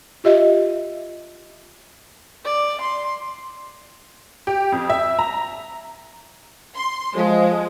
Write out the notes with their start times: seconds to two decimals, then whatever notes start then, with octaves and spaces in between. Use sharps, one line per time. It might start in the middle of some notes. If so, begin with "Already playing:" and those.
0.24 F4 G4 D#5 E5
2.45 D5
2.81 C6
4.47 G4
4.72 F2
4.90 E5
5.19 A#5
6.76 C6
7.16 F3 G#3